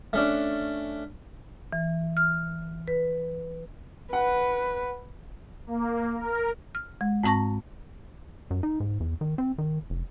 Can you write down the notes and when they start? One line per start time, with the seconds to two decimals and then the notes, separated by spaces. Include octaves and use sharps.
0.13 A3 C#4 D4
1.72 E3
2.17 F6
2.88 B4
4.13 B4 F#5
5.67 A#3
6.14 A#4
6.75 F6
7.01 G#3
7.23 G#2 C4 A5 C#6 A#6
8.51 F#2
8.63 D#4
8.80 G#2
9.00 E2
9.21 D#3
9.38 C4
9.58 D#3
9.90 F1